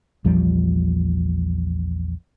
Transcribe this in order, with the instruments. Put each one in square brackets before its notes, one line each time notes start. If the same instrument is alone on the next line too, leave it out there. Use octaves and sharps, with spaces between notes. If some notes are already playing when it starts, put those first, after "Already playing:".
[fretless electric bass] A#1 E2 F3 G3